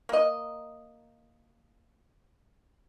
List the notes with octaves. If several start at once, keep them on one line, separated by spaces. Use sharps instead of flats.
A#3 D#5